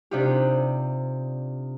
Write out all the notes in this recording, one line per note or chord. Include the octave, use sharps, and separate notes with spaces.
C3 D4 D#4 F4 G4